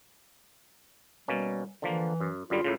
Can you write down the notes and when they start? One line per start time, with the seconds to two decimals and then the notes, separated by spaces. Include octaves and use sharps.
1.28 B2 G3 A#3 C#4
1.82 D3 E3 F3 A#3
2.20 F#2
2.50 F#2 D3 G3 F4
2.64 C#2 A2 C#3